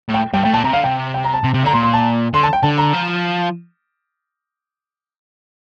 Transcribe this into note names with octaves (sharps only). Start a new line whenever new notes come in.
A2
G5
G2 G5
A2 G5
A#2 A5
C3 A#5
D3 F5
C3 G5
G5
A#5
A5
C3
C3
D3 A#5
A#2 C6
C6
A5
D3 C6
A5
G5
D3 A5
A#5
F3